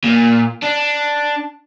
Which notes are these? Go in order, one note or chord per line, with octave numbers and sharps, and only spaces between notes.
A#2
D4